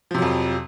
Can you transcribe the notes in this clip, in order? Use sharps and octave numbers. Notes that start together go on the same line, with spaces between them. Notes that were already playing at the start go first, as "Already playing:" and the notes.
F2 C3 F3 F#3